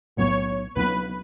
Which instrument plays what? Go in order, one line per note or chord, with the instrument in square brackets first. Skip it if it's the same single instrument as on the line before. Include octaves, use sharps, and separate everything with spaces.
[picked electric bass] B1 A2 F#3 B3 [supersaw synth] C#5
[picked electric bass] C#2 B2 F#3 B3 [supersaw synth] B4